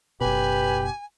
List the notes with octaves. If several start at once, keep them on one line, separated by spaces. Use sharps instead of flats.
F#1 B2 G4 B4 G#5